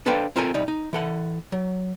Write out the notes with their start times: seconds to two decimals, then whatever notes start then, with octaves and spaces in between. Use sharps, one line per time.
0.06 D4 A4 B4 C5 F5 G5
0.36 C4 F4 A4 A#4 C5 G#5
0.54 C2 G3 D#4
0.68 D#4
0.93 E3 A4 F#5
1.52 F#3